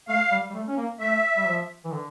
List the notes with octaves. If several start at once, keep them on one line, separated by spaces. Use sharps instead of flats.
A3 F5
G3
G3
A3
C#4
A#3
A3 E5
G3
F3
E3
D3